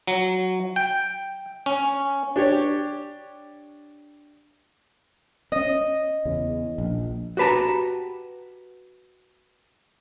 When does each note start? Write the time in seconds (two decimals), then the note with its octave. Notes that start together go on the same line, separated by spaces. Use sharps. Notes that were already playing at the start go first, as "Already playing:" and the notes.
0.07 F#3
0.76 G5
1.66 C#4
2.36 D4 G4 C#5
5.52 C4 C#4 D#5
6.25 E2 C#3
6.78 A#1
7.37 F#4 G4 B4 A5 A#5